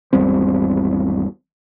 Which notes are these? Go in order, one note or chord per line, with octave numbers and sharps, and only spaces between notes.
G#1 E2 G3 C4